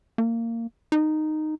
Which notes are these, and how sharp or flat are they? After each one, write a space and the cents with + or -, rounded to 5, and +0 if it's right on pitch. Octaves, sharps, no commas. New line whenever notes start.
A#3 -20
D#4 -10